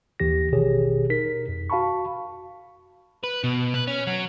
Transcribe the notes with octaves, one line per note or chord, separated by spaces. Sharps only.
D#2 E3 G4 A#6
A1 B2 D#3 G4 G#4 C#5
D#4 A#4 B6
F2
F#4 F5 A5 B5 C#6
B4
B2
B4
C#4
F#3